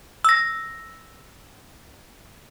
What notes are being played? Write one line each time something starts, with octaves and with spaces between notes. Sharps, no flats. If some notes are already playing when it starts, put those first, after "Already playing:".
E6 A#6